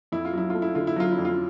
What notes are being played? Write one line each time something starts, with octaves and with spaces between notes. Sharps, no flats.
F2 E4
F4
F#3 E4
A3 F4
E4
D3 F4
E4
F#3 F4
E4
F2
F4